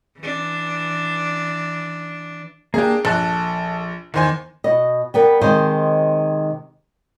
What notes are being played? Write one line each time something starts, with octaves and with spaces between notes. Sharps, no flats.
E3 D4
A#3 D4 G4 G#4
A#1 A4 A5 F#6
E2 D#3 C5 G#5
B2 D#5
G3 B3 A#4
C3 D#3 G#3 C5 D#5